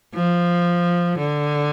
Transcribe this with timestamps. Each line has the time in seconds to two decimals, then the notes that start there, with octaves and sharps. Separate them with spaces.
0.15 F3
1.18 D3